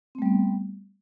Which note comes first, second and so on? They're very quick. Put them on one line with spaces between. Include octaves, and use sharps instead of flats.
C4 A3 G3 B3